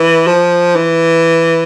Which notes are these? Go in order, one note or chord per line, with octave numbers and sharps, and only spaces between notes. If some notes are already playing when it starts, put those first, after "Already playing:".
Already playing: E3
F3
E3